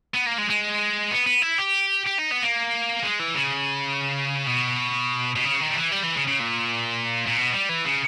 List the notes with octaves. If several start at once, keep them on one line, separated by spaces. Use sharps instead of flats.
B3
A#3
G#3
G#3
B3
B3
E4
G4
G4
D#4
B3
A#3
G#3
E3
C#3
B2
B2
C#3
D#3
G3
E3
G3
E3
C#3
C#3
A#2
A#2
B2
G3
E3
C#3